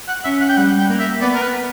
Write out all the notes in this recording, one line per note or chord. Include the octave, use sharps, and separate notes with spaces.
F#5
C#4 E5
F#5
G5
G3 F#5
G5
A#3
E5
B3 D5
A#4
B4